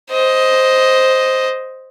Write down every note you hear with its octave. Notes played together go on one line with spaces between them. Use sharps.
C5 D#5